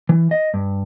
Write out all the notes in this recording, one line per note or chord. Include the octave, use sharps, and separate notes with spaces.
E3
D#5
G2